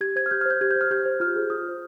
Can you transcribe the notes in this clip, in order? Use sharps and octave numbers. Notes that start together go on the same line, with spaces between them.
G4 G#6
C5 G#6
F6
G4 G6
F6
C5 G6
G4 G#6
G6
C5
F6
G4 G6
C5
F4 F6
G#4 C5
F4 D#6
G#4 C5